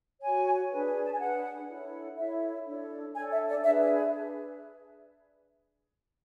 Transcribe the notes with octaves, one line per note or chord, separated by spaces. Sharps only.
F#4 C#5 G#5
D4 G#4 B4
A5
G#5
D4 G#4 B4 F#5
E4 A4 C#5
E4 A4 C#5 E5
D4 A4 C#5
D4 A4 C#5 G#5
E5
D5
D4 G#4 B4 E5
E5